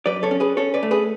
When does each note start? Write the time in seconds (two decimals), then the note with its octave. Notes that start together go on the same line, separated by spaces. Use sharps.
0.06 F#2 B4 D5
0.23 A4 C#5
0.31 C#4
0.40 G#4 B4
0.57 C#4 A4 C#5
0.74 B4 D5
0.83 A3
0.91 G#4 B4